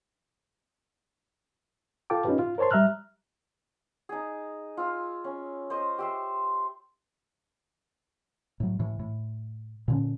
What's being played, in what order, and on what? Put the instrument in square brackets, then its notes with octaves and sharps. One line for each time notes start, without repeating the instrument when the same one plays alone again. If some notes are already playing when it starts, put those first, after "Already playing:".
[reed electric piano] F4 A4 F5 G5 A5 D6
C#4 D#4 F4 G4 B4
F4
A#4 C5 C#5 A5 C6
G3 E5 A#5 F6 F#6
[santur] D#4 G#4
F4 E6
C#4
C5 D#5
G4 E5 C6
[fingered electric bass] A2 F#3
A2 E3
A2
A#2 D3 C#4